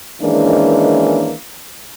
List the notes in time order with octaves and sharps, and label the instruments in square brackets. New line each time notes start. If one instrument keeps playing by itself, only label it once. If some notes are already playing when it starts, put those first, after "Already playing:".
[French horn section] D#3 E3 G#3 A#3 C#4 D4